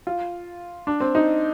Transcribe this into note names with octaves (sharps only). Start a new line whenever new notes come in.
F4
D4
C4
D#4